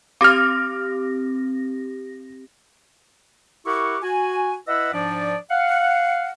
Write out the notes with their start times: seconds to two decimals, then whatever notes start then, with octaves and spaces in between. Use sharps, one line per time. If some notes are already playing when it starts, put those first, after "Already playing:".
0.21 C4 G4 D6 F6 A#6
3.66 E4 G4 A#4 F#5 C#6
4.03 F#4 G#5
4.68 E4 B4 D#5 E5 F#5 E6
4.94 G#2 F3 D4 D5
5.51 F5 F#5